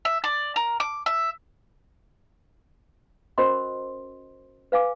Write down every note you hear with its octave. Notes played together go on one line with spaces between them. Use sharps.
E5
D5
A#4
D6
E5
C#4 F#4 A#4 C5 D#5 C6
B4 F5 G#5 D6